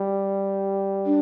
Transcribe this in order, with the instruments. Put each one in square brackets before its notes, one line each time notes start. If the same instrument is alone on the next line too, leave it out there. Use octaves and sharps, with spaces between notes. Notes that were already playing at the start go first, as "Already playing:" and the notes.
Already playing: [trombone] G3
[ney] D4